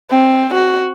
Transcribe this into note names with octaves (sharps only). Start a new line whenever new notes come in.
C4
F#4